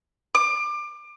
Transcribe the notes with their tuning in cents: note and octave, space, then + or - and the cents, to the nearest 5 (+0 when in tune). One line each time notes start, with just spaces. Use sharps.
D6 +25